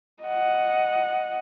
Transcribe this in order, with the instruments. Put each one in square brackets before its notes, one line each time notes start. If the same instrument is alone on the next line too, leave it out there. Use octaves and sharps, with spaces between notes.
[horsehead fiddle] D#5 F#5